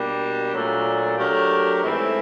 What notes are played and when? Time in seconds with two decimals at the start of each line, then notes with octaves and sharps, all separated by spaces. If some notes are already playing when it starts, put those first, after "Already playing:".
Already playing: B2 G3 A#3 D4 G4
0.52 A#2 F#3 A3 D4
1.18 F#3 A3 D4 G4 A#4
1.83 G#2 E3 A3 C4 E4